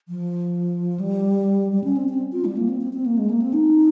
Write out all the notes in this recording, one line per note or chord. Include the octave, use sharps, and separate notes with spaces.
F3
G3
G3
C#4
C4
C4
F4
G3
A#3
C4
C4
C4
A#3
G#3
A#3
C4
D#4